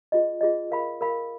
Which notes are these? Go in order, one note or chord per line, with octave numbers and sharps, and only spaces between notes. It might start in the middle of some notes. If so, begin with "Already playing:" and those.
F4 G#4 D#5
F4 G#4 D#5
A#4 F5 B5
A#4 F5 B5